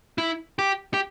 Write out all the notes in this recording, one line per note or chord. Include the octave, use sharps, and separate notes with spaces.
E4
G4
G4